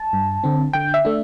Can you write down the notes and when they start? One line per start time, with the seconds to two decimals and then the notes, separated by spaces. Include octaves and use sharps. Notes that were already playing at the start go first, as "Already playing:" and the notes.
Already playing: A5
0.13 G2
0.44 D3 C4
0.73 D3 G5
0.94 E5
1.05 A3 D4